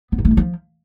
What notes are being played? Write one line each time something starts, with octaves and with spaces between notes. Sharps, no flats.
B3
D#3
A3
E3
F3